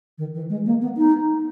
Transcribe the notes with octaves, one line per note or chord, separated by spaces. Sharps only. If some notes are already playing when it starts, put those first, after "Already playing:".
D#3
E3
G#3
A#3
B3
D#4